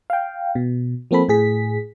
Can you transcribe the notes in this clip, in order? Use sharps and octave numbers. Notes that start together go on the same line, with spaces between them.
F5 G5
B2
F3 A#3 C4 A4 B5
A2 G#4 B6